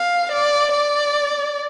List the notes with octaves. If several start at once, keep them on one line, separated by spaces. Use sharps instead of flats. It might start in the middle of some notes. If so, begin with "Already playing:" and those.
Already playing: F5
D5
D5